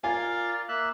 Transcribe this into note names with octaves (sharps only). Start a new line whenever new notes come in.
F4 A#4 D5 G#5
A#3 E5 F#6